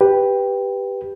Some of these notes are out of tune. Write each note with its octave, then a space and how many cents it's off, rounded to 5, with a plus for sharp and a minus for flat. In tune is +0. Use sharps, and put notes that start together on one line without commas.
G4 +5 B4 +0